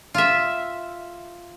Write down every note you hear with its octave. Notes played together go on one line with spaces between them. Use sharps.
F4 E5